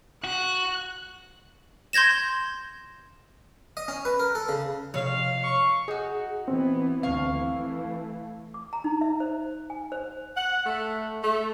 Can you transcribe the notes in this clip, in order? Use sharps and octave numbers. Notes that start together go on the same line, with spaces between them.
F#4 F#6
C6 G6 G#6 A#6 E7
D#5
C#4
B4
A#4
A4
C#3
F2 C3 F3 C#5 F5
C#6
D#4 F#4 G#4
E3 B3 C4
D2 F5 C#6
E3 A3
D6
A#5
D#4
E5
C5
G#5
C5
F#5
A3
A3